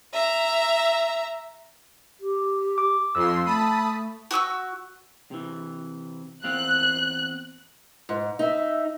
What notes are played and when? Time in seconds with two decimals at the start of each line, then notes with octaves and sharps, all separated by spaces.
0.13 E5 A#5
2.20 G4
2.78 D6
3.15 F2 C6 E6
3.45 A3 A5 B5 D#6
4.31 F#4 C#6 D#6 E6
5.31 C3 E3
6.44 E2 C4 F5 F#6
8.09 G#2
8.39 D#4 E5